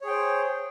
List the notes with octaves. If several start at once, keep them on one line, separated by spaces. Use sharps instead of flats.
G#4 C5 C#5 G5